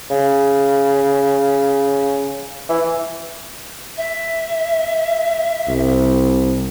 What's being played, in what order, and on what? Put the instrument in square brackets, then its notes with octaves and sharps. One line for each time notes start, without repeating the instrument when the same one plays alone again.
[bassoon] C#3
E3
[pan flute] E5
[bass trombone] C2